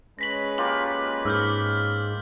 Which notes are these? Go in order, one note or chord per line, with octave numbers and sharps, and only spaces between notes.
G#3 C#4 B4 A#6 B6 F#7
A#3 F4 G4 F#7
G#2 E6 F6 G6